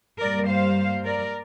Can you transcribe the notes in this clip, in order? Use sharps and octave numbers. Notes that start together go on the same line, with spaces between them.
G2 G3 A#3 A#4 D5
C5 F5
A#4 D5